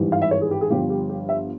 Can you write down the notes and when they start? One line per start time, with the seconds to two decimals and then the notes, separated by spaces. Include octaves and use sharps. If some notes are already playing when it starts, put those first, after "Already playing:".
Already playing: G#1 G2 E3
0.12 F5
0.22 E5
0.31 C#5
0.41 G#4
0.51 G4
0.61 G#4
0.70 G1 G2 F3 G4
0.90 G4
1.09 G4
1.29 E5